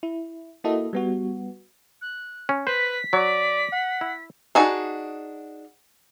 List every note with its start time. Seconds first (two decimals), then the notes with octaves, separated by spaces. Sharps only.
0.03 E4
0.64 A#3 E4 F#4 A4 D#5
0.93 G3 B3 F#4
2.01 F#6
2.49 C#4
2.67 B4 C5 B6
3.13 F#3 D5
3.73 F#5
4.01 E4
4.55 D4 D#4 F#4 G#4